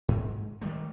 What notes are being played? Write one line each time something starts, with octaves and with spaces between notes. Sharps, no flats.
G#2
D#3 G3 A3